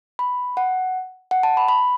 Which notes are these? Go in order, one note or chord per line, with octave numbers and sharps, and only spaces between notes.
B5
F#5
F#5
A5
B5
B5